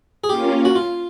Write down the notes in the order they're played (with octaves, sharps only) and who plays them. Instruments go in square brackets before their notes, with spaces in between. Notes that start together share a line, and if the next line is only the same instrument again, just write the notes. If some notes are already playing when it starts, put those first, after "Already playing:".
[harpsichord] G#4
[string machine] A#3 C#4 F4 [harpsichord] G4
[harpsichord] F#4
F4